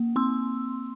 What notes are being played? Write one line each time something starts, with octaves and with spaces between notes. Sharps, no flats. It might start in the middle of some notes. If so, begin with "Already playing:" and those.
Already playing: A#3
C4 C6 E6